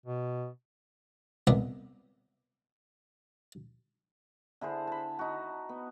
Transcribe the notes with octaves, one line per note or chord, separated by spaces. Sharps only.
B2
C2 B3 D4 D#5 E5 B5
D3 E4 G#4 C5
A5 B5
D#4 F#4
B3